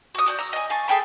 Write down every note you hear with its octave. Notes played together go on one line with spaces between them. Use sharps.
F#4 D#6
F#4 D5 G6
A#5 E6
D#5 G#5
F5 G#5 A5 C#6
G#4 A4 G5 B5